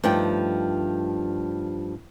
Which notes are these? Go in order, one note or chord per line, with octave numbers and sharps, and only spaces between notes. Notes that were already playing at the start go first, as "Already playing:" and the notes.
G2 F3 A3 D#4 G5